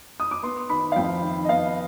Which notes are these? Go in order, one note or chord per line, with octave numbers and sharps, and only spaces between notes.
D#6
D6
B3 C6
D#3 B5
F5
F2 G5
D#3
D#5
B3 F5